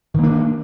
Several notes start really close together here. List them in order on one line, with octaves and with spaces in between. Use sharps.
D#3 A#3 D4